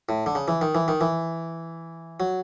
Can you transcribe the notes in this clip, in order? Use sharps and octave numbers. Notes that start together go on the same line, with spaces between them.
A2
D3
C#3
E3
D#3
E3
D#3
E3
F#3